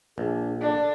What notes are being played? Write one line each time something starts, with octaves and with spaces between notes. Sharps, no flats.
A#1 D4 G#4
D3 D4